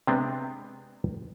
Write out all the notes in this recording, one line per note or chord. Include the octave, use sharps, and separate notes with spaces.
C3 G#3 B3 C4 D4